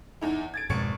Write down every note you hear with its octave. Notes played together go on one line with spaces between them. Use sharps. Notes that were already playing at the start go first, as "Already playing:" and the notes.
E2 D#4 E4
G#6 A6 D7
G#1 F2 B2 G#3 C#6 C#7